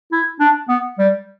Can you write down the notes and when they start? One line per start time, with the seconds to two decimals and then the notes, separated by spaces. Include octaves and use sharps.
0.12 E4
0.40 D4
0.69 B3
0.99 G3